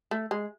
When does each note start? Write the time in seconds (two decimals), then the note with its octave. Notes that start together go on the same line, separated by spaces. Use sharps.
0.11 A3
0.31 G#3